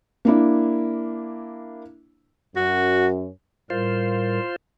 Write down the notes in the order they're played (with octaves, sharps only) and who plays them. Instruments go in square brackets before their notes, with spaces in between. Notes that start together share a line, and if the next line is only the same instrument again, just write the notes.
[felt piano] A#3 D4 E4
[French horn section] F#2 [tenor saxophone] F#4
[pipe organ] A2 G3 A#4 [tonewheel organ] F4 C5